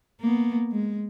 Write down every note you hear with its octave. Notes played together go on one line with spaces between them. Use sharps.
A#3 B3
G#3